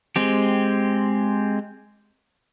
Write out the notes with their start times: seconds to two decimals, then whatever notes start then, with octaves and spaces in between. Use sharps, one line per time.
0.16 G#3 C4 G4